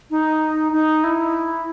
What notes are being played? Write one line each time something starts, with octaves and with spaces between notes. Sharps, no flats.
D#4
D#4
E4